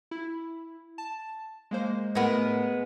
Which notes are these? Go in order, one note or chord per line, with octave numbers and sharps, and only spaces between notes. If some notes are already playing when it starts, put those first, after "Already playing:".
E4
A5
G#3 A#3 C5
A2 G#3 A3 B3 A#4